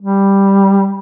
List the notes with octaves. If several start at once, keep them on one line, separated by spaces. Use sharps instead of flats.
G3